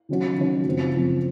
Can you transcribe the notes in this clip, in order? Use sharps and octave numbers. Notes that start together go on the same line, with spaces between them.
D#3 F#3 C#4 F#4 C#5
D#3 F#3 C#4 F#4 C#5
F#2 C#3 F3 C4
F#2 C#3 F3 C4